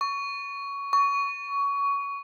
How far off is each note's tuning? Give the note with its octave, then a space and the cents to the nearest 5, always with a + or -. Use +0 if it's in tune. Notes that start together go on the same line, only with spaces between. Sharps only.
C#6 +15
C#6 +20